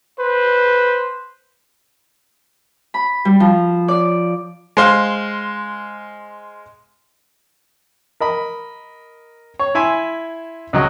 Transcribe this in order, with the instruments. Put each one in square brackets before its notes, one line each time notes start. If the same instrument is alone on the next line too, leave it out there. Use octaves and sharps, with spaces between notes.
[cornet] B4 [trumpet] C5
[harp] B5
G3
F3
D5
[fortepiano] G#3 C5 F5
A#4 D#5 B5
C#5
E4 E5 G#5 C6
C#2 F#3 D#5